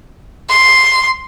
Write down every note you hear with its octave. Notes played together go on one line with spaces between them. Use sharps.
C6